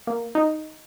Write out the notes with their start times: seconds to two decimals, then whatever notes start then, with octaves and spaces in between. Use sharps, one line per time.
0.07 A#3
0.35 D#4